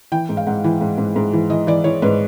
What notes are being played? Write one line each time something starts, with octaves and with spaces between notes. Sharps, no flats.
E3 G5
G#2
F5
G#2 F#5
E3
G#2
G#2
G#2
E3
E3 D#5
E3 D5
E3 C#5
G#2 B4